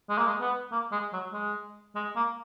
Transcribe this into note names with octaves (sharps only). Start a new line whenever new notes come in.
G#3
A#3
G#3
B3
A#3
G#3
F#3
G#3
G#3
A#3